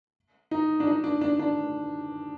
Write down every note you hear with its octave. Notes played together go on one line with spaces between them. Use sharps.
D#4
D4
D#4
D4
D4
D4